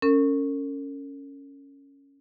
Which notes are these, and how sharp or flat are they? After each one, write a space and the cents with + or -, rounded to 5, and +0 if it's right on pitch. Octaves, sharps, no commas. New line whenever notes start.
C#4 +0 A#4 -40